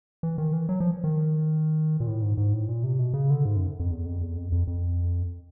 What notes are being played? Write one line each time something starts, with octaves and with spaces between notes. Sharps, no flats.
E3
D#3
E3
F#3
F3
D#3
A#2
A2
G#2
G#2
A2
A#2
C3
B2
C#3
D3
G#2
F#2
F2
E2
F2
E2
F2
F2
F2